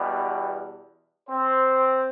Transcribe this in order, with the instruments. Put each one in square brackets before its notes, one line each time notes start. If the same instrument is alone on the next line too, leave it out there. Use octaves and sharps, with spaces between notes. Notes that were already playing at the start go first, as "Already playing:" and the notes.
Already playing: [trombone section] E2 B2 G3
C4 C5